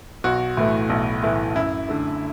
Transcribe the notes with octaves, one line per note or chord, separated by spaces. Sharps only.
B1 F#4
A2 E3 A3
B1
A2 E3 A3
F#2 E4
D3 A3